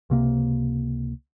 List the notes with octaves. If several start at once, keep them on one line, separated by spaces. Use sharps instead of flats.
C#2 C3 A#3